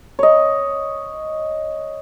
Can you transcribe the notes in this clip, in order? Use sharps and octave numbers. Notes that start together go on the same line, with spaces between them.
C#5 D#5